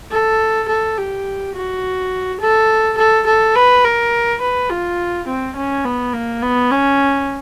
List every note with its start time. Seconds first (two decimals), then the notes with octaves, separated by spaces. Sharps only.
0.12 A4
0.68 A4
0.97 G4
1.55 F#4
2.40 A4
2.98 A4
3.27 A4
3.55 B4
3.84 A#4
4.41 B4
4.70 F4
5.27 C4
5.56 C#4
5.85 B3
6.13 A#3
6.42 B3
6.71 C#4